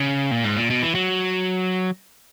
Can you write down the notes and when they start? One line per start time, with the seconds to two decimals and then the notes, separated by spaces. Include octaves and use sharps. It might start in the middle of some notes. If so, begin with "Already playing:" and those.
Already playing: C#3
0.31 A#2
0.44 G#2
0.57 A#2
0.70 B2
0.82 E3
0.95 F#3